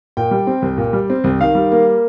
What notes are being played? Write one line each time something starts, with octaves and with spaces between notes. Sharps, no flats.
A#2 G5
G3
C4
C2
A#2
G3
C4
C2
D#3 F5
G3
A#3